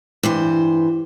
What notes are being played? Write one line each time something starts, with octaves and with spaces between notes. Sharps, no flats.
G2 E3 C5